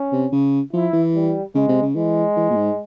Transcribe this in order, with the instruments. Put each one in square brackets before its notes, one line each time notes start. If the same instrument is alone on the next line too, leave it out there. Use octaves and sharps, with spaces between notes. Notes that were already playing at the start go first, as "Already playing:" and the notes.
Already playing: [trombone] C#4
[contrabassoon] C3
C#3
[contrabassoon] F3 [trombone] E4
[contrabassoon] E3
[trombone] G3
[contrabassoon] C#3 [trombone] G#3
[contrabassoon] C3
C#3
[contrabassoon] E3 [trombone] G#3
[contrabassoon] E3
A#2
G#2